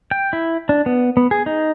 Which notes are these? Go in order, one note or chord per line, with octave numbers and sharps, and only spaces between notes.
G5
E4
D4
B3
B3
G#4
D#4